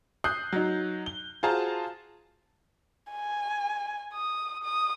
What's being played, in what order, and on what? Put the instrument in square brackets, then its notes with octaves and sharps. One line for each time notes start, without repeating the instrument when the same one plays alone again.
[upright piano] D#6 F#6 G6 C7
F#3 D#4
G7
F4 F#4 G#4 C5 A5 A#5
[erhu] G#5
D#6
D#6